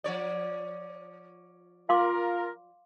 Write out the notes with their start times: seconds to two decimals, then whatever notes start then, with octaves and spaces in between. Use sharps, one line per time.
0.04 F3 C#5 D5
1.89 F4 A#4 F5 C6 D6